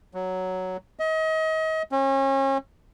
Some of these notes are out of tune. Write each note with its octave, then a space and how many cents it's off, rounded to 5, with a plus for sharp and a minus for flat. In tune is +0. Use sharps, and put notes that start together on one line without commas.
F#3 +5
D#5 +35
C#4 -35